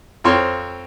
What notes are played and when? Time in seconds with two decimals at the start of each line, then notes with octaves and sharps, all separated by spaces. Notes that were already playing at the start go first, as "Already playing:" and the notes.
0.24 F2 C4 F4 C#5 C6 C#6